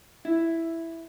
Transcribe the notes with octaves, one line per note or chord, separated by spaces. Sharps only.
E4